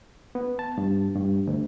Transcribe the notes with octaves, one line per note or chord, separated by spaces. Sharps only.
B3
A5
G2
G2
D2